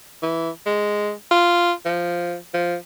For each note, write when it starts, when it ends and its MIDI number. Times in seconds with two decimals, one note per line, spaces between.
0.23 0.50 52
0.66 1.12 56
1.31 1.73 65
1.85 2.37 53
2.54 2.76 53